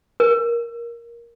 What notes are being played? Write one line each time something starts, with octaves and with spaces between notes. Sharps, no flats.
A#4